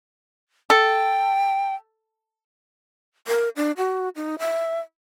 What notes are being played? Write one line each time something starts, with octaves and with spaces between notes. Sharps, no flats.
A4 G5
A#4
D4
F#4
D#4
E5